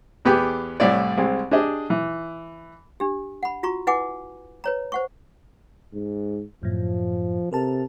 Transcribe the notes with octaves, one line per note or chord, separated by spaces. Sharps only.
E2 B3 G4 G#4 G5
C2 A2 C#5 D5
C2 G#3 C4
D4 G4 G#4 D#5
E3
D4 G4
F#5 B5
F4 F#4 A#5 C#6
E4 B4 F#5 G#5 D6
B4 C#5 A#5
C5 F#5 C#6
G#2
F#2 A2 F3
C3 A4 A#4 A5